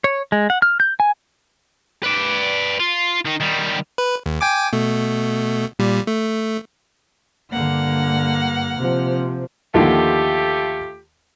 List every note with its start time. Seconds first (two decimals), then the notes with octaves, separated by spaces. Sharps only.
0.04 C#5
0.32 G#3
0.50 F#5
0.62 F6
0.80 G6
1.00 G#5
2.04 B4 D5
2.80 F4
3.25 D#3 D#4
3.40 D#3 G3
3.98 B4
4.26 D#2
4.41 G5 G#5 D6
4.73 B2 A3
5.79 A#2 G3
6.07 A3
7.52 G2 D3 A#3 F#5 F6
8.77 C3 F3
9.74 D#2 D3 F3 A3 F4 G4